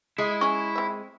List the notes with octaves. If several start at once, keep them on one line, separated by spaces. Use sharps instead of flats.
G#3 E4
C#4 G#4 C#6
C4 E5